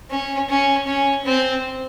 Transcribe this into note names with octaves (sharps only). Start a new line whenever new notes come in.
C#4
C#4
C#4
C4